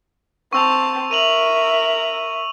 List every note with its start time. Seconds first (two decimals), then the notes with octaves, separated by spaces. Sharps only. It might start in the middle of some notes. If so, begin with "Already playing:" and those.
0.53 C4 A5 C#6 E6 F7
1.11 A#4 E5 D#7 F7 F#7